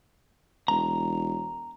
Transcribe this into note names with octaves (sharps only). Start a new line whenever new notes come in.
E1 A#5